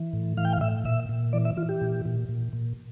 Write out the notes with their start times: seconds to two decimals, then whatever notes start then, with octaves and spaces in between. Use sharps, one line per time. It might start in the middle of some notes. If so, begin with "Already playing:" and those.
Already playing: E3
0.13 A2
0.37 E3 F5
0.45 G5
0.53 F5
0.61 A2 E5
0.85 A#2 E5
1.09 A#2
1.33 E3 D5
1.45 E5
1.57 E3 F4
1.69 G4
1.81 A#2
2.05 A#2
2.29 A#2
2.53 A#2